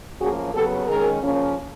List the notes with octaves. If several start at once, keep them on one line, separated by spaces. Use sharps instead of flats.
A2 F3 A#3 C#4 F#4 G#4
C#3 F#3 B3 G4 A4
D#3 G#3 C#4 G#4 A#4
C#3 F3 A#3 C#4